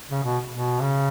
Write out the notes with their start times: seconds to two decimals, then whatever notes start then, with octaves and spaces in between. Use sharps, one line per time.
0.10 C#3
0.24 B2
0.51 B2
0.81 C#3